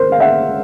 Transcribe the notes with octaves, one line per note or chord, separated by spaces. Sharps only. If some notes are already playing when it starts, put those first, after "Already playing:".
Already playing: A#4 C5
F5
E5 F#5